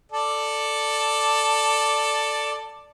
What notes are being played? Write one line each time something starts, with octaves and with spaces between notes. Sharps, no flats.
A4 D5